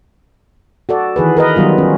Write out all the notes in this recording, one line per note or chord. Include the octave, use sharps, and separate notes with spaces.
F#4 A4 D5
D#3 E3 G#4 B4
A#4 B4 D#5
D#3 F#3 G3 B3 F4
C#4